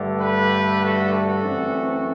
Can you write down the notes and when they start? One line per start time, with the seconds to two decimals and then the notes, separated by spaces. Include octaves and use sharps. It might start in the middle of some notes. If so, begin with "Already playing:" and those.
Already playing: G2 D3 A3
0.21 G4 B4
0.82 F#4 A4
1.13 F#4 A4
1.44 F#2 E3 A3 C4